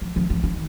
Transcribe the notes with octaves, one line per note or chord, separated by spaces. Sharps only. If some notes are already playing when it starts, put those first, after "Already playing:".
F3
F3
F3
D#3